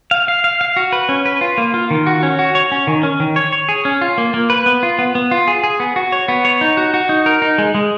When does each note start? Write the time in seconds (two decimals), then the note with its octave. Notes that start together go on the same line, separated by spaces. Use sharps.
0.11 F5
0.28 F5
0.44 F5
0.61 F5
0.76 F#4
0.92 B4
1.09 C#4
1.26 B4
1.41 F4
1.58 A#3
1.74 F4
1.91 D#3
2.07 F#4
2.23 C#4
2.39 F#4
2.55 C#5
2.72 C#4
2.87 D#3
3.03 C#4
3.20 D#3
3.36 C#5
3.52 C#5
3.69 G#4
3.85 C#4
4.01 F4
4.18 A#3
4.34 A#3
4.50 B4
4.66 B3
4.83 F4
4.99 B3
5.15 B3
5.31 F4
5.48 G#4
5.64 G#4
5.80 B3
5.96 F#4
6.12 C#5
6.28 B3
6.45 C#5
6.61 D#4
6.77 F#4
6.94 F#4
7.09 D#4
7.26 A#4
7.42 D#4
7.58 G#3
7.75 G#3